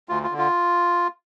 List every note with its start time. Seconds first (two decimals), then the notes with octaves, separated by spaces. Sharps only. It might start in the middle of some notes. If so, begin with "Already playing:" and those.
0.09 D2 F4
0.24 F4
0.31 D3
0.38 F4